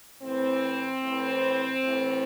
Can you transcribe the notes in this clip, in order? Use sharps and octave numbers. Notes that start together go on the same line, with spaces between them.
A2 E3 C4
A2 E3
A2 E3